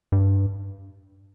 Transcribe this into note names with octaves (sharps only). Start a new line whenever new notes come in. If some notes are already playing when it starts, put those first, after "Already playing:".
G2